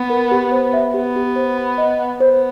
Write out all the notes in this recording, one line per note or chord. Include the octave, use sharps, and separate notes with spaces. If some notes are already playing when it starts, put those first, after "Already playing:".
Already playing: B3
A#4
G4
C5
E5
B3 G4
G4
C5
B5
D#5
F#5
B3 C5